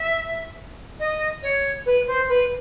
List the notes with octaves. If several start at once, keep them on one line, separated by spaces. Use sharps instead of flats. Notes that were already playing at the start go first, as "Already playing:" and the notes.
Already playing: E5
D#5
C#5
B4
C5
B4